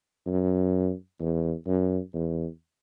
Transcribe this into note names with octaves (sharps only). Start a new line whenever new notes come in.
F#2
E2
F#2
E2